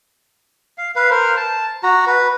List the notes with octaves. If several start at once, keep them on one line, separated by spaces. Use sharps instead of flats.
F5
B4 F5
A#4 C5
A5
F#4 A#5
B4